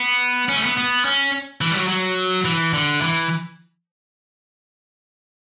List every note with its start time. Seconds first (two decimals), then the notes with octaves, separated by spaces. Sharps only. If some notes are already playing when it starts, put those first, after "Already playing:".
Already playing: B3
0.49 C#4
0.57 A3
0.63 B3
0.77 B3
1.05 C#4
1.61 E3
1.71 G3
1.75 F#3
1.89 F#3
2.45 E3
2.73 D3
3.01 E3